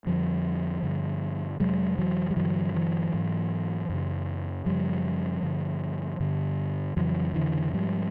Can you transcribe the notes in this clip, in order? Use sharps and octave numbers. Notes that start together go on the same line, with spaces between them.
F2 D3 F3 G3
G2 D3
F2 C3 F#3 G#3
E3 F#3
G3
G2 D3 E3 F#3
E3 F#3
G#2
F#2 C#3
F#2 C#3 F3 G3
G2 D3
G2 D3
F2 C#3 E3 F#3
D3 E3
G#2 F3 G3